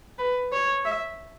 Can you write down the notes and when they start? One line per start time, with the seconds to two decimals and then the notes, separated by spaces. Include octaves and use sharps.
0.19 B4
0.52 C#5
0.85 E5